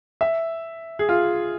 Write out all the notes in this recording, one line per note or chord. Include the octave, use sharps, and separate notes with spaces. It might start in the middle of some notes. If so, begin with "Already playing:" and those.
E5
G#4
F4